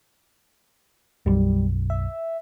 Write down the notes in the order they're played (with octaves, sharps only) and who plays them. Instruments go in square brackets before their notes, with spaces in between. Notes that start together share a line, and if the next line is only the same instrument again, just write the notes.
[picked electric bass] B1 F#2 [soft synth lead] G3
[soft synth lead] E5